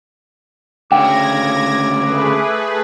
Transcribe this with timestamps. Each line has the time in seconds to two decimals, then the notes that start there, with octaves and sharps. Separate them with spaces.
0.92 D2 C#3 G5 D6 G#6 A#6
2.01 A3 G#4 B4